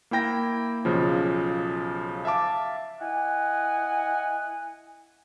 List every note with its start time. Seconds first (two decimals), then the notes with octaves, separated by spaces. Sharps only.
0.11 A#3 E4 G5 A#6
0.85 B1 C#3 F3
2.25 E5 F5 A5 D6
3.01 E4 D#5 F#5 G#5